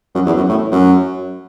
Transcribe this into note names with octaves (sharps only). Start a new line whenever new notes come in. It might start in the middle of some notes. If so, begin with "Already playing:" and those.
F#2
E2
F#2
A2
F#2